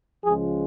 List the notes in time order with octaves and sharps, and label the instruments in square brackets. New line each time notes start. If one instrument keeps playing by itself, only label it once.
[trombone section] C#2 C#3 F3 G#3 G#4